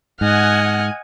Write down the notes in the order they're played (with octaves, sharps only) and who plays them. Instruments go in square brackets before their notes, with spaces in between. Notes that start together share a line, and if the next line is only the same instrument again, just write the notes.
[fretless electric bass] G#2 [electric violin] D#5 F6 [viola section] F#5 G#5